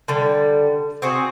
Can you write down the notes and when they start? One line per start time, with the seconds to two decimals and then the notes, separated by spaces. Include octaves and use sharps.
0.08 D3 G3
1.02 C4 F#4 G#4